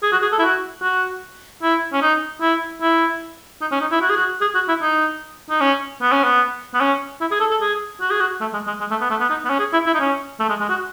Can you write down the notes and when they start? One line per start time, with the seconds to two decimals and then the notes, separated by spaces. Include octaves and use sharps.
0.03 G#4
0.12 F#4
0.22 G#4
0.32 A4
0.39 E4
0.42 F#4
0.82 F#4
1.63 E4
1.93 C#4
2.02 D#4
2.42 E4
2.82 E4
3.61 D#4
3.72 C#4
3.81 D#4
3.92 E4
4.01 F#4
4.10 G#4
4.17 F#4
4.41 G#4
4.55 F#4
4.69 E4
4.82 D#4
5.50 D#4
5.61 C#4
6.02 B3
6.12 C#4
6.24 B3
6.74 B3
6.81 C#4
7.21 E4
7.31 G#4
7.40 A4
7.51 A4
7.61 G#4
8.01 F#4
8.10 G#4
8.20 F#4
8.41 A3
8.53 G#3
8.67 G#3
8.80 G#3
8.91 A3
9.01 B3
9.10 A3
9.20 B3
9.30 D#4
9.45 B3
9.50 C#4
9.60 G#4
9.73 E4
9.86 E4
9.94 D#4
10.00 C#4
10.40 A3
10.49 G#3
10.60 G#3
10.70 F#4